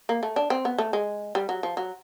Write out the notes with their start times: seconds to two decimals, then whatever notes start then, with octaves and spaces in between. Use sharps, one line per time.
0.09 A#3
0.23 A3
0.36 D4
0.50 C4
0.65 B3
0.78 A3
0.93 G#3
1.35 G3
1.49 F#3
1.63 F3
1.77 F#3